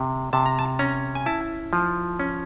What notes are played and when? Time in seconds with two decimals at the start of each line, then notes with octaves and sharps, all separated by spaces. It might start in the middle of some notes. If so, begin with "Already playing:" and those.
Already playing: C3
0.33 C3 A5
0.46 A#5
0.59 A5
0.79 C#4 A#5
1.15 G#5
1.26 E4 A5
1.73 F3
2.20 C#4